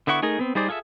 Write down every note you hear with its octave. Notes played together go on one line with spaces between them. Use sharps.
D3 B3 E4 F#5 C#6
A3 D#4 G#4 A#4
B3 C4
G3 D#4 G#4 C5 D5
F4 G#4 A4 C#5 E5